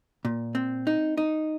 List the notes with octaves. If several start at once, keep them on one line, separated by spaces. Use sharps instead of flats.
A#2
C4
D#4
D#4